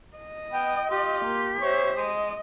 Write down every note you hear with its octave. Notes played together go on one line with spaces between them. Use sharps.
D#5
B3 G5
F4 G4
A#3
C5 C#5 E5
G#3 D#5